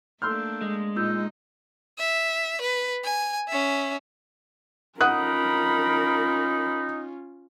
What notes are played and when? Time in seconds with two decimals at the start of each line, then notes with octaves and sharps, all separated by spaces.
0.22 A3 A#3 D4 A4 C6 E6 F6 G6
0.61 G#3
0.96 A#2 D#4 F4 E6 G6
1.99 E5
2.61 B4
3.04 G#5
3.49 C#4 E5
5.01 C#4 D#4 F4 A#4 F#5 B5 D#6 F#6